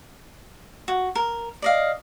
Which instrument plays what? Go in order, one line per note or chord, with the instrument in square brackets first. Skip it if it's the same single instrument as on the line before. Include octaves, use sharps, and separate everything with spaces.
[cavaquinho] F#4
A#4
D5 D#5 F5